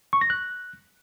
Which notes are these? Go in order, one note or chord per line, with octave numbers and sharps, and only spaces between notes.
C#6
A#6
F#6